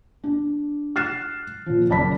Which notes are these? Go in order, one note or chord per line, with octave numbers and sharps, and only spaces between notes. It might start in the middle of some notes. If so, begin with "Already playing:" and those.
D4
F6 F#6 A6 C7 E7
A#2 F3
F#1 D5 A5 B5 B6